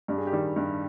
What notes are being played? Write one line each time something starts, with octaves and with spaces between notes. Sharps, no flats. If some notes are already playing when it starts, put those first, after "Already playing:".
G2 G4
G#4
G4
D#3 G3
G2